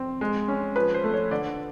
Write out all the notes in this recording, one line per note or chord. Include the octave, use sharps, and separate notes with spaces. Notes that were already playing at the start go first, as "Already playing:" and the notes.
Already playing: C4
G#3
C#4
F3 B4
C5
A3
C#5
D3 D5